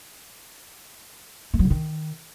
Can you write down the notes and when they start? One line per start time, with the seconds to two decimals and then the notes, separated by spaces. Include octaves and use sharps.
1.54 A3
1.59 F#3
1.65 C#3
1.70 D#3